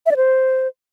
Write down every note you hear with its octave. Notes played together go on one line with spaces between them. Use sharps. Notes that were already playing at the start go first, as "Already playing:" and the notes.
E5
D5
C5